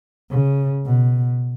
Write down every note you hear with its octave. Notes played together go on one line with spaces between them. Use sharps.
C#3
B2